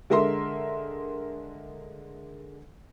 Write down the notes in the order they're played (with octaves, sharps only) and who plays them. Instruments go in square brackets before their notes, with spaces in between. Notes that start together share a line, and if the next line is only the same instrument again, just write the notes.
[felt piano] D3 G#3 A#4 E5 C6